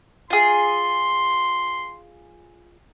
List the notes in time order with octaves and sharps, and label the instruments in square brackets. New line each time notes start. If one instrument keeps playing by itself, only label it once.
[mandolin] F4 G#4 [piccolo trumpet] C6